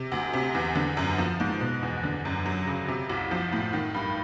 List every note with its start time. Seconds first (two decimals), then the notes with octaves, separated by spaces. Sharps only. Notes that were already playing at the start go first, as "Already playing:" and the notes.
Already playing: C3
0.12 D2
0.33 C3
0.55 E2
0.75 D3
0.97 F#2
1.18 F3
1.40 G#2
1.61 B2
1.83 E2
2.03 D3
2.25 F#2
2.46 F#3
2.67 C#3
2.88 C3
3.10 C2
3.31 F3
3.52 A2
3.73 D#3
3.94 G2